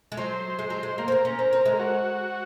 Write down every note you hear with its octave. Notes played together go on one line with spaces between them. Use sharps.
G#3
F#3 C5
G#3
F#3
G#3
A#3 A#4
C4
A#3
C#4
C4
C4
G#3
F#4